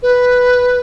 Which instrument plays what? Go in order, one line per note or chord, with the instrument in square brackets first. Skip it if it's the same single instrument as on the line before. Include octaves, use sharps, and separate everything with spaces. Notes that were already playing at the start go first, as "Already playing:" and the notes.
[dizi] B4